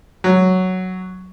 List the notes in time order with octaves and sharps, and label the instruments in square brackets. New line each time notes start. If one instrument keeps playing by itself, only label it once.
[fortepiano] F#3